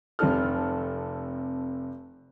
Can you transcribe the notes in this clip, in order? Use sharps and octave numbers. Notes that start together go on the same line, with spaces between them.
F1 C3 C4 A4 F6